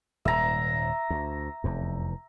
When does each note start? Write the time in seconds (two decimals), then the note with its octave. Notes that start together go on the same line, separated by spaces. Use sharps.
0.25 D#1 G#2 E5 A#5
1.10 D2
1.64 F1 E2